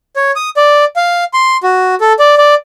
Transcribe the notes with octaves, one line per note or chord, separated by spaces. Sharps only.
C#5
D#6
D5
F5
C6
F#4
A4
D5
D5